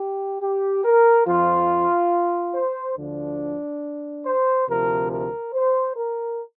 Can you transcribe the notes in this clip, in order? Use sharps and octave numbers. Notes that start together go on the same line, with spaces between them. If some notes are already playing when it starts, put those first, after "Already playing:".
Already playing: G4
G4
A#4
F2 F3 F4
C5
D2 D3 F3 D4
C5
D2 C3 F3 A#4
A#4
C5
A#4